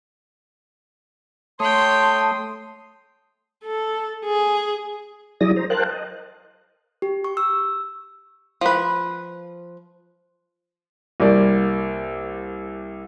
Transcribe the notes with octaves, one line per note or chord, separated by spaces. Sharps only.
A3 C#5 G5 A5 C6 D#6
A4
G#4
F#3 E4 G#4 D5 D#6 A#6
C5 A#5
A#4 C5 F5 G5 A5 F#6
D#5
G4
C#6
E6
F3 B4
C2 A#3 D5